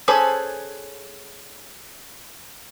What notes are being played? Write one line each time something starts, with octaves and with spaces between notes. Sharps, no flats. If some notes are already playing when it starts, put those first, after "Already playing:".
C#4 G#4 A4 B4 C5